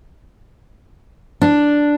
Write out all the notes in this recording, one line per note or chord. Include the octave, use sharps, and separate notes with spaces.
D4